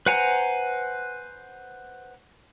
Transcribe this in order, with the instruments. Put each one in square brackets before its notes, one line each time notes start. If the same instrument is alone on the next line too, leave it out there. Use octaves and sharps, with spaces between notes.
[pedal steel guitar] B4 C5 F#5 G#5 A#5